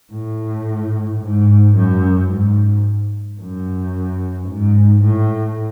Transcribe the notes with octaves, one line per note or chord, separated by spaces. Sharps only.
A2
G#2
F#2
G#2
F#2
G#2
A2